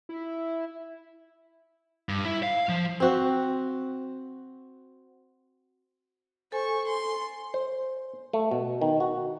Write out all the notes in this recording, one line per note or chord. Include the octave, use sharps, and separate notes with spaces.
E4
G2
E4
F5
F3
C4 F#4
A4 C5 G#5 C#6
C6
C5
A3
B2
D#3
F#4